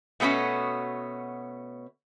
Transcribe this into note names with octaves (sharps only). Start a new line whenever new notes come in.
B2 A3 B3 C#4 F#4